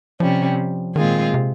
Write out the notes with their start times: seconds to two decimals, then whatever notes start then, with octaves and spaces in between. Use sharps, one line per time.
0.20 C3 F3 G3 C#4
0.96 A#2 D#3 G#3 C4 F4 G#4
1.34 C3